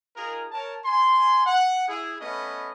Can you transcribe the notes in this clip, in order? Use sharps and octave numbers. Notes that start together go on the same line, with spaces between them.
D#4 F4 G#4 A#4
A#4 C#5 A5
G#5 C6
F#5
E4 G#4
A3 B3 C#4 B4 D#5